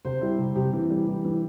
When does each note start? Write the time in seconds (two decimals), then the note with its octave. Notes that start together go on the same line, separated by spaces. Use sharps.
0.05 C3 C5
0.21 G3 E4
0.39 C3
0.55 C3 G4
0.73 E3
0.90 G3
1.07 E3
1.25 E3